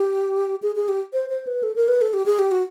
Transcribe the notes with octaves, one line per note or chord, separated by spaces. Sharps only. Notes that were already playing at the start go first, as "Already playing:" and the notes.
Already playing: G4
G#4
G#4
G4
C5
C5
B4
A4
A#4
B4
A4
G4
G#4
G4
F#4